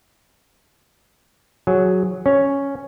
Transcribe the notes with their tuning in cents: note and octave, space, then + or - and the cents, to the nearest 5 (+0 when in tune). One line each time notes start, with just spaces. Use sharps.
F#3 +0 G#4 +0
C#4 +0 C#5 +0